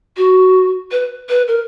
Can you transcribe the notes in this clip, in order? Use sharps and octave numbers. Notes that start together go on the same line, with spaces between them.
F#4
B4
B4
A#4